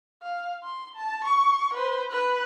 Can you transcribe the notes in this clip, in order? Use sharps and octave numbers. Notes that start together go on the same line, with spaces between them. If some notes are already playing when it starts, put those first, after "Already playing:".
F5
C6
A5
C#6
B4 C5
B4 F#6